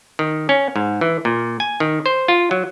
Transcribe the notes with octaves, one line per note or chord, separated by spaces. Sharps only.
D#3
C#4
G#2
E3
A#2
G#5
D#3
C5
F4
F#3